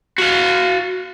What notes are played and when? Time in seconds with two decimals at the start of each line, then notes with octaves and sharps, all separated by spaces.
0.18 F#4 F5